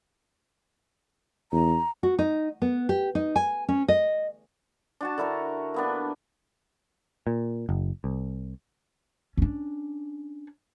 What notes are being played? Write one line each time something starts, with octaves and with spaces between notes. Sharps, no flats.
E2 A#5
F#4
D#4
B3
G4
D#4
G#5
C#4
D#5
D4 F#4 A5
D3 E4 A#4 C#6
A#3 B3 D4
A#2
F#1
C2
C#4 D4